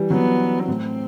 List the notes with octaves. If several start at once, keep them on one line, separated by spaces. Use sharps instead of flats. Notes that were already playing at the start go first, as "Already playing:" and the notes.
Already playing: E3 G3
F#3 B3
A2 C4